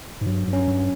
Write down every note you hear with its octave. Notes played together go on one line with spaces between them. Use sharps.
G#2
G2 F#3
G2
C#4
F#2
G2